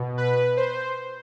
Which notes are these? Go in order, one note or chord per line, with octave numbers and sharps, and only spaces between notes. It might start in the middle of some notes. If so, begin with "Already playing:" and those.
Already playing: B2
B4
C5